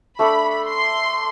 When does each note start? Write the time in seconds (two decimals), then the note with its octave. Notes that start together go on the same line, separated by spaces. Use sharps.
0.19 A3 D4 A4 D5 B5
0.67 C6